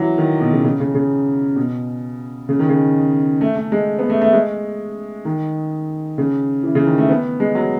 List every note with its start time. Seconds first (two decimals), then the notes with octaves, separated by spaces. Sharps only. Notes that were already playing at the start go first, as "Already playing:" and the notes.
Already playing: E3 F#3
0.18 D#3
0.41 B2
0.53 C#3
0.64 C#3
0.80 C#3
0.94 C#3
1.56 B2
2.49 C#3
2.59 D#3
2.69 C#3
3.41 A3
3.56 A3
3.72 G#3
3.99 B3
4.10 A3
4.21 A3
4.33 G#3
5.25 D#3
6.18 C#3
6.63 E3
6.75 C#3
6.86 D#3
6.98 A3
7.10 B3
7.40 G#3
7.55 F#3